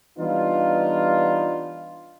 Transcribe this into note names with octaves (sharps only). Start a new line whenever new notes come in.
E3 G3 B3 D4 D#4 F4